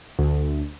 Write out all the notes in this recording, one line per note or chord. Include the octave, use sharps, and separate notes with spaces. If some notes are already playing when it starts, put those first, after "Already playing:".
D2